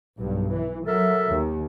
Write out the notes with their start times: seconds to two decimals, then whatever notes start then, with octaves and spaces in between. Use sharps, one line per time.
0.18 B1 G2
0.55 E3
0.87 F#3 A4 A#4 E5
1.27 D#2